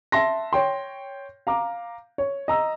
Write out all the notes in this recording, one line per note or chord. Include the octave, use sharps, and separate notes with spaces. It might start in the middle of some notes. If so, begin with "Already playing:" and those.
E5 A5 C6 A#6
C#5 G5 C6
F5 A#5 D6
C#5
D#5 A#5 E6